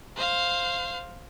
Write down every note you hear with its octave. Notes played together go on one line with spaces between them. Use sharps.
C5 F5